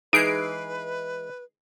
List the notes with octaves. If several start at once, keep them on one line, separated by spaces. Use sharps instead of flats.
E3 G#3 D#4 G#4 B4 C7 D7